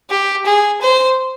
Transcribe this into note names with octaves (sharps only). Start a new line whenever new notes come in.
G4
G#4
C5